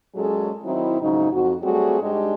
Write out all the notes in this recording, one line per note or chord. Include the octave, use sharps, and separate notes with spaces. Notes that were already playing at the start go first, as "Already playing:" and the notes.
A#2 F#3 G#3 C#4 G#4 A4
D#3 F#3 C4 D#4 E4
F2 G#2 C#3 F#3 D#4
F2 F#4
F#3 G3 A3 C4 F#4 G#4
G#2 G3 G#3 D4 G4 D#5